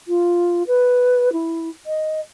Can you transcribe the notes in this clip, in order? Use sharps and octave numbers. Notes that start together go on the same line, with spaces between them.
F4
B4
E4
D#5